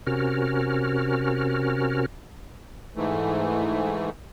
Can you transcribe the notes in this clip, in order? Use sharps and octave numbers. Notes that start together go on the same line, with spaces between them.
C3 C#4 F#4 A#4 F6
G#2 E3 A3